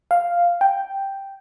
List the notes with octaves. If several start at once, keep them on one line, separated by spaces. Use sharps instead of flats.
F5
G5